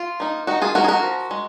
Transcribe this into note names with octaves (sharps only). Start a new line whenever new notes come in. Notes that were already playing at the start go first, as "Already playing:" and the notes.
Already playing: F4
A#3 D#4
D#3 D#4 F#4
F4 G#4
A#3 D#4 F#4 A#4
G#4
F#4 A#4
F3
G#3